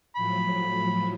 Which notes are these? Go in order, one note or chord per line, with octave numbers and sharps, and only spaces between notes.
A2 F3 F#3 B5